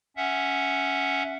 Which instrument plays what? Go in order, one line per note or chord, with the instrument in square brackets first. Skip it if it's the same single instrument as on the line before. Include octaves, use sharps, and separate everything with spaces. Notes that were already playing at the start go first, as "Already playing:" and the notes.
[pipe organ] C#4 E5 F#5